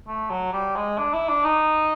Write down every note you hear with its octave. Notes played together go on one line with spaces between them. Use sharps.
A3
F#3
G3
G#3
D4
E4
D4
D#4